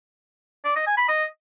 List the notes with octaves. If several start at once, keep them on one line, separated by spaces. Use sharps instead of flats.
D5
D#5
G#5
B5
D#5